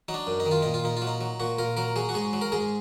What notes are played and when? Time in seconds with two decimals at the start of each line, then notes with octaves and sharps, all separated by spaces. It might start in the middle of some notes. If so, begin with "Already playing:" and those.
0.08 F#3 D#4
0.14 D4
0.27 F#2
0.40 D#4
0.46 D#3
0.51 F4
0.62 A#2 D#4
0.74 F4
0.84 A#2 D#4
0.97 F4
1.02 F#3
1.07 D#4
1.21 F#3
1.40 A#2 F#4
1.58 A#2 A#4
1.77 F#3 A#4
1.96 F#3 G#4
2.09 F#4
2.14 G#2 G#4
2.33 F#3
2.41 A#4
2.52 G#2 G#4